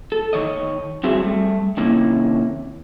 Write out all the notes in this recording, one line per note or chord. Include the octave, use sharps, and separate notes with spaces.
A4
D#3 C#5 D#5
G3 C4 F#4 G#4 E5
G3 A3
C3 D#3 A#3 C#4 E4